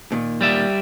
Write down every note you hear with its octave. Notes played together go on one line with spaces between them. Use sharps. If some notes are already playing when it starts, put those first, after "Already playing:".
A#2 D#3
G3 D5 E5